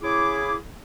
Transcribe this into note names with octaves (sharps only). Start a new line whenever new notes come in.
C#3 E4 G#4 D6